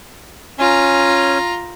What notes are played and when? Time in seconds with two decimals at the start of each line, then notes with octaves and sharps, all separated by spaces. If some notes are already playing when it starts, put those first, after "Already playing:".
0.59 C#4 F4 G#5 A#5